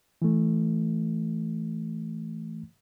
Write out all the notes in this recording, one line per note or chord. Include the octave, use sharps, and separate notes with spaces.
E3 A3